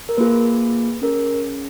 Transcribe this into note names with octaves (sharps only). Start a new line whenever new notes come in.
A#4
A#3 F4 G#4 B4
C#4 G#4 A#4